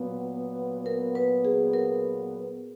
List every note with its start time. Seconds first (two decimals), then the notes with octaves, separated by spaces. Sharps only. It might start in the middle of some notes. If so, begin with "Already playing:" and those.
Already playing: A#2 F#3 B3
0.86 A#4
1.15 B4
1.45 G#4
1.73 A#4